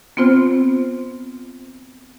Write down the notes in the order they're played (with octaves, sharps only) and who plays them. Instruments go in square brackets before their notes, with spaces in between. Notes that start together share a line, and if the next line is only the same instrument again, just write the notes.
[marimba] B3 C4 F4 C5 F6